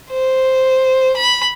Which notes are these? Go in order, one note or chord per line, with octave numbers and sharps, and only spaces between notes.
C5
B5